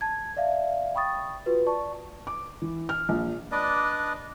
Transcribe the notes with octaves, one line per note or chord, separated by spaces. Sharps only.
A5 G#6
D5 E5 F5
G5 B5 C#6 D#6 A6
F4 F#4 B4
D5 A5 C#6
D6
E3
F6
A#1
D4 B4 D5 D#5